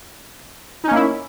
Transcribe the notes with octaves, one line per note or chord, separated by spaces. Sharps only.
A#3 C#4 D#4 E4